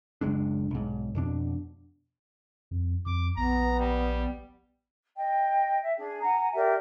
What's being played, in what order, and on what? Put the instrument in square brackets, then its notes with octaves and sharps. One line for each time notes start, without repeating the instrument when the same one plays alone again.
[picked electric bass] F#1 C#2 G#3 D4
B1 G#2
F2 B2 D4
[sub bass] F2
[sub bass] F2 [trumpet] D6
[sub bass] A#1 [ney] B3 [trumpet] A#5
[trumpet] G3
[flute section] D#5 G5
E5
D4 G#4
F#5 G#5 A#5
G4 A#4 D5 E5